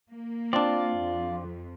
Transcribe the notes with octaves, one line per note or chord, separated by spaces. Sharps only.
A#3
C4 D4 F4 D5
F2